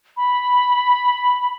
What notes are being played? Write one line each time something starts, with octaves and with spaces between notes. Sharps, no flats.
B5